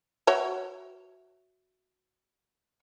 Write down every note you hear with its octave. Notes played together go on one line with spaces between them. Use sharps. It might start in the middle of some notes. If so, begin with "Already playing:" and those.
F#4 C#5 E5